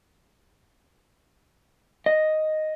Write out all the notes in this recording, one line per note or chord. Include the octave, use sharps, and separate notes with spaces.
D#5